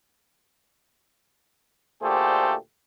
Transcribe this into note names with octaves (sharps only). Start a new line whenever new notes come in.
D2 A#2 A3 G4 G#4 C5